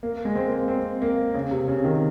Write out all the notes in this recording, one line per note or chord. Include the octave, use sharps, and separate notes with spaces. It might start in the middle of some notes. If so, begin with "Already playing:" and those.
A#3
G#3
C4
A#3
C4
A#3
C#3
C3
C#3
D#3